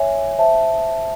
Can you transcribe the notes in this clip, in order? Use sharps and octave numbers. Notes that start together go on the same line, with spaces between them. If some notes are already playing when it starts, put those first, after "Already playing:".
Already playing: C#5 E5 G#5
C5 E5 A5